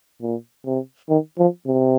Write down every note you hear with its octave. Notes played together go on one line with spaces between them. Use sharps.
A#2
C3
D#3
F3
C3